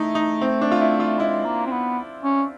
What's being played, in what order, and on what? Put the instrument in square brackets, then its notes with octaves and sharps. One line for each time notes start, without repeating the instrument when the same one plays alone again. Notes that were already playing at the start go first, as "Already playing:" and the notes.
Already playing: [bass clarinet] A3 [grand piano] D#4 E4
[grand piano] D#4
C4
D4
F4
E4
F4
[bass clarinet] G#3 [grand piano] E4
[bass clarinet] A#3
C4
B3
C#4